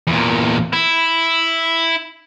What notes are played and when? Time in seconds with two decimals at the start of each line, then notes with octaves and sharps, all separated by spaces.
0.07 E2 A#2
0.73 E4